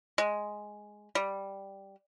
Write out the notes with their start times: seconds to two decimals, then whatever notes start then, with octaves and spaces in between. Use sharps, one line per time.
0.18 G#3
1.15 G3